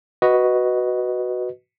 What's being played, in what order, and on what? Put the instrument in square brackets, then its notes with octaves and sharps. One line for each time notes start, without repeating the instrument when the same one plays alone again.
[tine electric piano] F#4 B4 D#5